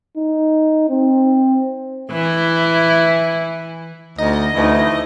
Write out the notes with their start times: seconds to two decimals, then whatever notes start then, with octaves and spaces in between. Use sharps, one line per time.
0.17 D#4
0.89 C4
2.12 E3 E4
4.18 D2 D#4 D#5
4.54 D2 E3 F3 A3 D#4 E4